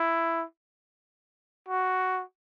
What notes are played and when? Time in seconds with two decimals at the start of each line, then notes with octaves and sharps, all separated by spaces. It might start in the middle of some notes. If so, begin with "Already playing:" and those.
Already playing: E4
1.69 F#4